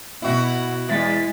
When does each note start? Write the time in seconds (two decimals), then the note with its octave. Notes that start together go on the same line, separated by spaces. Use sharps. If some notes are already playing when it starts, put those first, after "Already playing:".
0.22 B2 E4 F#4
0.89 E2 G#3 E4 A6 B6